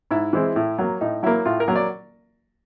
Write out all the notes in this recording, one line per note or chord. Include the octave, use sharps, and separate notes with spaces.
G#2 E4
E3 G#3 C4
A2
F#3 A#3
A2 D#4
F#3 A#3 E4
A2 F4
A#4
F#3 A#3
D5